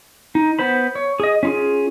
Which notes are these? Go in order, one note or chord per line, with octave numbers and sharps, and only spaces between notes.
D#4
B3 C5 B5
C#5
G#4 D#5
C#4 F4 G#4